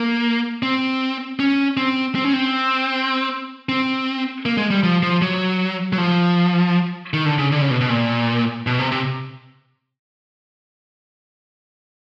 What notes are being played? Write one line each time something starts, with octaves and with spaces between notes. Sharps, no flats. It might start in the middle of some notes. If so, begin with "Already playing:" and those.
Already playing: A#3
C4
C#4
C4
C4
C#4
C4
C4
A#3
G#3
G3
F3
F3
F#3
F#3
F3
D#3
D3
C#3
D3
C#3
B2
B2
A#2
B2
C3
C3